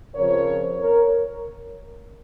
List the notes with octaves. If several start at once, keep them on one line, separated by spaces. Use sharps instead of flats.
C#3 F3 C4 A#4 C#5
A#4 C#5